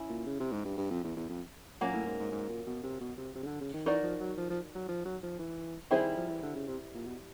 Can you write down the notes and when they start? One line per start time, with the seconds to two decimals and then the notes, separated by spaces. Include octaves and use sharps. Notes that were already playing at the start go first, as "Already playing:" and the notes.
Already playing: C#4 E4
0.09 A#2
0.26 C#3
0.40 C3
0.52 G#2
0.65 G2
0.78 G2
0.91 F2
1.04 E2
1.16 E2
1.29 F2
1.81 A#2 F#3 A#3 C#4
1.93 A2
2.06 G#2
2.20 G#2
2.32 G#2
2.49 A#2
2.67 B2
2.83 C3
3.00 B2
3.18 C3
3.35 C3
3.43 C#3
3.47 D3
3.61 C#3
3.73 D#3
3.85 E3 D#4 F#4 A#4 D5
4.03 F3
4.20 F#3
4.37 F3
4.50 F3
4.75 F#3
4.89 F3
5.05 F#3
5.23 F3
5.39 E3
5.91 D#3 G3 C4 E4 G#4 C5
6.04 D#3
6.17 F3
6.29 E3
6.42 D3
6.56 C#3
6.67 C3
6.94 A#2
7.06 B2